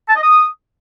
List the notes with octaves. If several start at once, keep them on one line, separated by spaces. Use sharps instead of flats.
A5
D#5
D#6